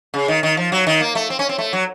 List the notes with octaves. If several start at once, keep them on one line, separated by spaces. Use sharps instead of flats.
C#3
D#3
D#3
F3
F#3
D#3
A#3
A3
C4
C#4
C4
A3
F#3